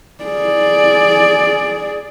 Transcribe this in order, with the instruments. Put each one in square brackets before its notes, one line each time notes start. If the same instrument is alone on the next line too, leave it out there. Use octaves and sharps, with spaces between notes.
[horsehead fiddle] G#4 D5